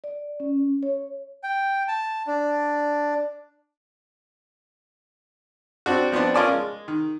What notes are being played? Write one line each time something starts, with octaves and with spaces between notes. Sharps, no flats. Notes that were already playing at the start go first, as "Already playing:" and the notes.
D5
C#4
C#5
G5
A5
D4
C4 D4 F#4
F3 B3 C4 D4
C#4 F4 A#4 D5 G#5 A5
G#3
D#3